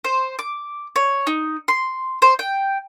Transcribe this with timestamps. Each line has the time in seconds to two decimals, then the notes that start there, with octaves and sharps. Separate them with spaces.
0.04 C5
0.39 D6
0.96 C#5
1.27 D#4
1.68 C6
2.22 C5
2.39 G5